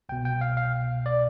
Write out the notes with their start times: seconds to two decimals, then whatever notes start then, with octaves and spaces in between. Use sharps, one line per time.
0.09 C2 B2 G5
0.25 G5
0.41 F5
0.57 F5
1.06 D5